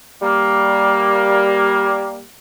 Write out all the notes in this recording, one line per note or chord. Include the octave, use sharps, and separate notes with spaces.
G3 A#3